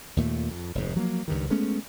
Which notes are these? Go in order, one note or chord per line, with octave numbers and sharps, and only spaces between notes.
D#2 A#2 A3
F2
F1 D#2 G#2
F3 F#3 A3 A#3
C#2 G2 D#3
G#3 A3 B3 C#4